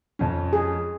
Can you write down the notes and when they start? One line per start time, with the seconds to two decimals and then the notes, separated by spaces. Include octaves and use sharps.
0.19 F2 C#4
0.53 G#4